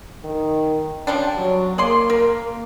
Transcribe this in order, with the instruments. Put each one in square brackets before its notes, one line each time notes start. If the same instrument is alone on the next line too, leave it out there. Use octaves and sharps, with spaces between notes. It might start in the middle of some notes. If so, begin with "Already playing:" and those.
[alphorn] D#3
[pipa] F3 G3 D4 [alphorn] C#4
[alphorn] F#3
[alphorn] A#3 [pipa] G#4 D5 C6
[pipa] A#4